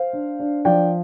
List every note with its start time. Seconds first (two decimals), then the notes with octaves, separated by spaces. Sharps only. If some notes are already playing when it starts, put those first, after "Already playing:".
Already playing: C5 F5
0.13 D4
0.40 D4
0.65 F3 D5 G5